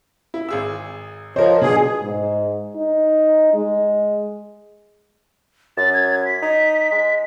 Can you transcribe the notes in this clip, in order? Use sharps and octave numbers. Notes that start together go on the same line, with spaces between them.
E4
G#1 G#4 E6
F3 A#4 C5 C#5 D#5
B2 D4 G#4
G#2
D#4
G#3
F#2 A6
G#6
B6
D#4
G#3